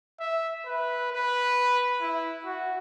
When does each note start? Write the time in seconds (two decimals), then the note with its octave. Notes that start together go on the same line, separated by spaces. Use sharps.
0.20 E5
0.66 B4
1.13 B4
2.01 E4
2.45 F#4